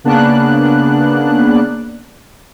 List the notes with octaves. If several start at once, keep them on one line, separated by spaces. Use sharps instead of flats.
C#3 A#3 B3 D4 F#6